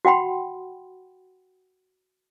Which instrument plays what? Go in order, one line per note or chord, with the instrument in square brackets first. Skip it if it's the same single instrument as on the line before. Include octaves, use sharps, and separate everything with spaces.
[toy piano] F#4 F#5 G5 B5 C6